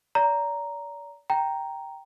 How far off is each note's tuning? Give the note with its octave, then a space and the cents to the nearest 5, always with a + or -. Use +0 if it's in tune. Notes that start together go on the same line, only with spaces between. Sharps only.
D5 -40 A#5 +0
G5 +0 A#5 +0